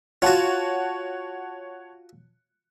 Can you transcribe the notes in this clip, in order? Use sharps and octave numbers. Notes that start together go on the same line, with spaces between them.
F4 F#4 C#5 F#5 A5